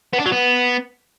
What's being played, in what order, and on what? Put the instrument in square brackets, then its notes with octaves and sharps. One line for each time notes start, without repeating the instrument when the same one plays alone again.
[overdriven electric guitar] B3
D4
F#3
B3